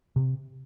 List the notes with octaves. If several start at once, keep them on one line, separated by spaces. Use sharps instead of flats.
C3